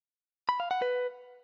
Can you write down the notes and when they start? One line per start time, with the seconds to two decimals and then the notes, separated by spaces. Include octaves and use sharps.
0.49 B5
0.60 F5
0.71 F#5
0.82 B4